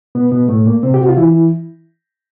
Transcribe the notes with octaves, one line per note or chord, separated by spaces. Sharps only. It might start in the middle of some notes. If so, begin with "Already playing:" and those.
B2 B3
B2 B3
A2 A3
A#2 A#3
C3 C4
G4
F#4
F4
E3 E4